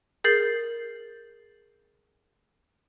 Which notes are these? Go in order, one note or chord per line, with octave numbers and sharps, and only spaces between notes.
G#4 A#4 G6 A6 C7 F#7